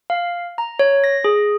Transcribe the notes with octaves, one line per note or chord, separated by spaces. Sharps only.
F5
A#5
C#5
A#6
G#4